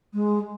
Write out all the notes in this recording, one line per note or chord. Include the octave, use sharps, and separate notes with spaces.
G#3